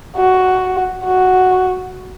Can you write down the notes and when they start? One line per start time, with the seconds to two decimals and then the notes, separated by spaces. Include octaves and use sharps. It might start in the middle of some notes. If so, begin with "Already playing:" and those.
0.17 F#4
1.05 F#4